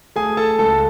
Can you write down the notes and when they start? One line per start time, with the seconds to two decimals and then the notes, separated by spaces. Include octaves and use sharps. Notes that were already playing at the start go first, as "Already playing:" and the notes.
0.16 A3 G#4 G#5
0.37 A4 A5
0.58 C#2 A4 A5